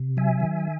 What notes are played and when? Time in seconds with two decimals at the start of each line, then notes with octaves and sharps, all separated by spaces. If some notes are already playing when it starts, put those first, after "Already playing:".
Already playing: C3
0.17 F#3 E5 G#5
0.40 D#3